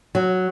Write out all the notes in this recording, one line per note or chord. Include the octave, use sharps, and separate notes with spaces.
F#3